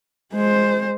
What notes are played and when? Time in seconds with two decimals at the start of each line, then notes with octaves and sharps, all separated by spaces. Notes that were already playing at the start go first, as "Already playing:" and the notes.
0.33 G#3 C5